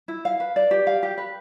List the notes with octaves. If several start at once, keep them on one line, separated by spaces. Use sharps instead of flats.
E4
F5
B4
D5
G4
F5
G4
B4